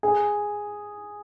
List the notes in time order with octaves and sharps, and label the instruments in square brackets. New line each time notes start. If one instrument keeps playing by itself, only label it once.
[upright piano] G#4